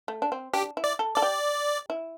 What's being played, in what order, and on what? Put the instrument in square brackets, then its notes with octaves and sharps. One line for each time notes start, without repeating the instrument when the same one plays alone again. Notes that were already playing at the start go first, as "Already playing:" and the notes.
[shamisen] A3
D4
C4
[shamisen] D4 [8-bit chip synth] G4
[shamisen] E4
[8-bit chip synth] D5
[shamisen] A4
[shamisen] A4 [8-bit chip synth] D5
[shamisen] G4
E4